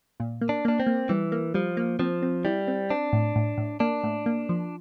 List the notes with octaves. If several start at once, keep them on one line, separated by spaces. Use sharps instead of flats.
A#2
A#3
D4
A#3 D4
C4
A#3
E3 G3
A#3
F3 G3
A#3
F3 C4
C4
G3 E4
C4
C4 D4
A2
A2
A2
A#3 D4
A2
A#3
F3